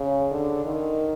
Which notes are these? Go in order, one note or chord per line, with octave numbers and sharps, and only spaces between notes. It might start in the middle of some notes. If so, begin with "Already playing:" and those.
Already playing: C#3
D3
D#3